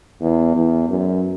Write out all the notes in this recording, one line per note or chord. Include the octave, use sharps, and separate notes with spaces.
E2
E2
F#2